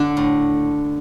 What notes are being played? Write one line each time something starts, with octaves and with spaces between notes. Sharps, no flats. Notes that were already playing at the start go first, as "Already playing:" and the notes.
Already playing: D3 D4
A2